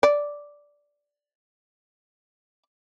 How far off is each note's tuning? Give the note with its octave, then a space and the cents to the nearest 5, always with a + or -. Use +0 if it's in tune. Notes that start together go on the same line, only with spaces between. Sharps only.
D5 -5